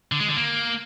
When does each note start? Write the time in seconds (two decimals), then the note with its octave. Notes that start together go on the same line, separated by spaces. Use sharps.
0.12 D3
0.20 G#3
0.28 D3
0.37 A#3